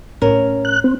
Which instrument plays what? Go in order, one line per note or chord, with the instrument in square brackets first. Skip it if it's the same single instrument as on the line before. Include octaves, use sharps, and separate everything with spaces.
[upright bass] A2 [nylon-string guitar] C#4 A#4
[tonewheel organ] F#6
C4